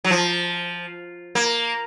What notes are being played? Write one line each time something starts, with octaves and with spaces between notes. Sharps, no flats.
F#3
F3
A#3